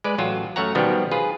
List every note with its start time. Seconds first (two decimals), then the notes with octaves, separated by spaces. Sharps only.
0.04 G#3 B4 D5
0.18 A1 F#3 F4
0.56 F#2 A3 C#5 F#5 A#5
0.75 B2 D#3 F3 G3 B3
1.12 F4 G#4 B4